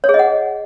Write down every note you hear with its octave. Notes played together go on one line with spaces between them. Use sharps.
C#5
G#4
D#5
F#5